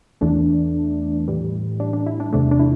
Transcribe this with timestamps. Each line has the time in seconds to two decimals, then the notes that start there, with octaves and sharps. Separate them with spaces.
0.21 E2 E3 A3 D4
1.28 A2 E3 G3
1.80 D4
1.93 D4
2.06 E4
2.20 D4
2.33 E2 C3 A3 D4
2.51 D4
2.59 E4